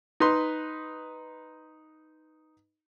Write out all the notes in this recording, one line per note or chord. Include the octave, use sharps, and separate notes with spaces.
D#4 B4 C6